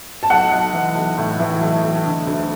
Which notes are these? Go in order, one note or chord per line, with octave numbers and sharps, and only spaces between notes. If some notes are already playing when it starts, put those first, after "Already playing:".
A5
B1 F#5
B1
E3
B1
A2
E3
B1
B1
D3
D2